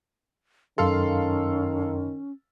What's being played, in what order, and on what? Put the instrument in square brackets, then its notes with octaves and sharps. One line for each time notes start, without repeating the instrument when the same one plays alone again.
[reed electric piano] F#2 C6 [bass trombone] D#3 [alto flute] C#4 [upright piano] A4 F5